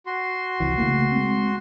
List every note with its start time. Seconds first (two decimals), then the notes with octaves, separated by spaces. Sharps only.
0.06 F#4 C6
0.60 C2 E3
0.78 C#3 A3 A#3
1.12 G#3 C4